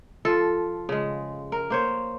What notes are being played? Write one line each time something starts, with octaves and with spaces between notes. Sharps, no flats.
F3 F4 A4
C#3 G#3
A#4
A#3 C5 C#5